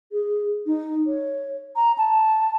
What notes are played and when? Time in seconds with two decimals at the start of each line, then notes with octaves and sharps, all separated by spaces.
0.12 G#4
0.66 D#4
1.07 C#5
1.76 A#5
1.98 A5